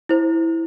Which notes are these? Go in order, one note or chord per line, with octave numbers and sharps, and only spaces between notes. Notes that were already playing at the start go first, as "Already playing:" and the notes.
E4 C5